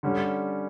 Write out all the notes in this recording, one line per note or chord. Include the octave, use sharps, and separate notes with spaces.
D3 G3 C#4